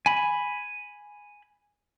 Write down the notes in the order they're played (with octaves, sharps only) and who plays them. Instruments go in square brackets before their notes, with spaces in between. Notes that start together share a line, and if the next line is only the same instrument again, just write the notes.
[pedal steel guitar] G#5 B5